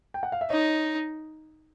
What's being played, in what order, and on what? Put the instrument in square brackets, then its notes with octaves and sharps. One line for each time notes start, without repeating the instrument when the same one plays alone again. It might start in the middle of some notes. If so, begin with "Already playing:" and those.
[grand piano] G5
F#5
F5
E5
[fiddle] D#4 [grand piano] C#5 D#5